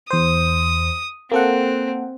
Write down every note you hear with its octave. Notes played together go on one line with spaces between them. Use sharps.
E2 C5 D#6
A#3 C4 A4 F#5